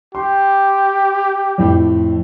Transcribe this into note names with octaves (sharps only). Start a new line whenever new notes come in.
G4 C6
F2 A2